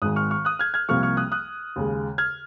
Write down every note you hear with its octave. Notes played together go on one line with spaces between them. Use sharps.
G#1 G#2 D#3 G#3 D#6 F#6
C#6 F6
C#6 F6
D#6 F#6
F6 G#6
F6 G#6
C2 C3 F3 A#3 C#6 F6
C#6 F6
D#6 F#6
D#6 F#6
D#2 C#3 G#3
F6 G#6